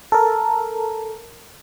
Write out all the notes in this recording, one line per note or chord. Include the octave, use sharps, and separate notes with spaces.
A4 A#4